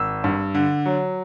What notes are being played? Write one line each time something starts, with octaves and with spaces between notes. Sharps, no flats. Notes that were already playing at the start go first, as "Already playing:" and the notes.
Already playing: G#1 E6
G2
D3
F#3